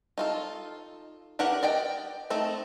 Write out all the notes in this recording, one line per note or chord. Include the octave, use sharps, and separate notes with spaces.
D#4 F4 A4
E3 G4 A#4 D5 F#5
D5 D#5 G5
A3 C4 D#4 A4